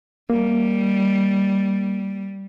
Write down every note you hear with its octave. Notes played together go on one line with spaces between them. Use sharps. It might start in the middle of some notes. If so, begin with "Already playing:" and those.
G3 A#3